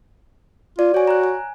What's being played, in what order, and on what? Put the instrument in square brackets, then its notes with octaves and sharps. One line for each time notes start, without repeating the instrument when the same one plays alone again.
[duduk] F4 [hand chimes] D5
[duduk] F#4 [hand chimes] C#5 G#5
[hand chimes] A#5 F#6
G#5